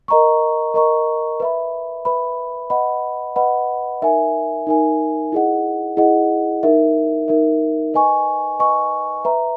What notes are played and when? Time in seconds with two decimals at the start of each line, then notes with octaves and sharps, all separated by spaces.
0.08 A#4 D#5 A#5 C#6
0.74 A#4 D#5 A#5 C#6
1.40 B4 E5 B5
2.05 B4 E5 B5
2.70 B4 D#5 F#5 B5
3.36 B4 D#5 F#5 B5
4.02 D#4 A#4 E5 G#5
4.67 D#4 A#4 E5 G#5
5.32 E4 G#4 D#5 F#5
5.97 E4 G#4 D#5 F#5
6.63 D#4 A#4 E5
7.28 D#4 A#4 E5
7.94 B4 D#5 G#5 C#6
8.59 B4 D#5 G#5 C#6
9.24 B4 E5 A#5